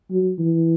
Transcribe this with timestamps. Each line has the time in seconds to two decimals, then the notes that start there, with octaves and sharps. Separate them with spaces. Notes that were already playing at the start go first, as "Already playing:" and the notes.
0.11 F#3
0.39 E3